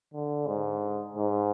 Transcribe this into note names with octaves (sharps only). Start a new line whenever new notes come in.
D3
G#2
G#2